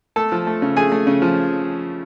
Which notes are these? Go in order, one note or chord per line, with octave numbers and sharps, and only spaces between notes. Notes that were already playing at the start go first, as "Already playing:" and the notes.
A3 A4 A5
F3
A3
C#3
A3 G#4 G#5
A3
C#3
F3